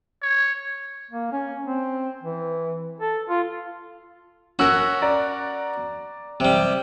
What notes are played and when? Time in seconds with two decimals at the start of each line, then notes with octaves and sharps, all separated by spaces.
0.22 C#5
1.11 A#3
1.32 C#4
1.64 C4
2.23 E3
3.01 A4
3.29 F4
4.59 C#4 F#4 A#4 E6 F#6
5.02 D5 A#5
6.40 C3 G3